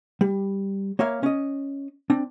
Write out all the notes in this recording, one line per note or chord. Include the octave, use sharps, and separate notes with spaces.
G3
A#3 C#5 E5 F5
C#4 D#5
C4 D4